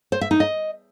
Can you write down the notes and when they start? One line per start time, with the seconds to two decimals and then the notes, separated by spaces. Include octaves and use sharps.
0.12 C5
0.21 E5
0.31 D#4
0.40 D#5